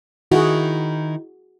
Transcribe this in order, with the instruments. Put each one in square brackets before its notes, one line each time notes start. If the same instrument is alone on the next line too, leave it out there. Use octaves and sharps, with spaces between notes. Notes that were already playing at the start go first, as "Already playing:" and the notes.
[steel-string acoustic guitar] D#3 D#4 E4 [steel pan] F#4 G#4